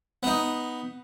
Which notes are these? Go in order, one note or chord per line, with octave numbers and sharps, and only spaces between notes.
B3 D#4